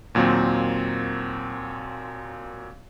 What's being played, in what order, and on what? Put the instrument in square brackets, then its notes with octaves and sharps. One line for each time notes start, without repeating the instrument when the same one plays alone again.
[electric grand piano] D#2 A#2 F#3 A#3 C4